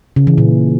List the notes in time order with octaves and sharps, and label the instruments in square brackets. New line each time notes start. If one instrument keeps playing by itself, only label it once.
[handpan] C#3
E3
A#2